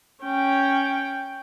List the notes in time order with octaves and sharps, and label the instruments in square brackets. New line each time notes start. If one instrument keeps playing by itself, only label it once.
[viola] C#4 G5